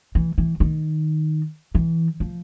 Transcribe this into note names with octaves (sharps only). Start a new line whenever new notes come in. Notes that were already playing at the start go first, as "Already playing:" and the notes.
E3
E3
D#3
E3
F3